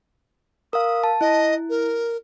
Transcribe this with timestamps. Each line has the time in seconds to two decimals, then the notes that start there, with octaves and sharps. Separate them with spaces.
0.73 A#4 F5 D#6
1.04 A5
1.21 E4 D#5
1.69 A#4